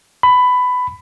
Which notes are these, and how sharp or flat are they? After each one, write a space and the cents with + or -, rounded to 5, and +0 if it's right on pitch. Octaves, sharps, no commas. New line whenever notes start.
B5 +15